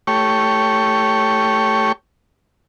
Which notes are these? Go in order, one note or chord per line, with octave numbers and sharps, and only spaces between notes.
A3 G4 C#5 C#6